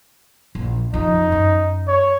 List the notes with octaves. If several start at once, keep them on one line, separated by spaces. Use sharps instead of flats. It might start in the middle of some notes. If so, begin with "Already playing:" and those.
A#1
F2 C#3 D#4
F#2
C#5